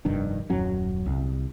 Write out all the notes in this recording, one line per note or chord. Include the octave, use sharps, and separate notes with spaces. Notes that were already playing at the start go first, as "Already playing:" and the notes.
F1 G2 D#3 D4
D#1 F#2 F#3 C#4
C2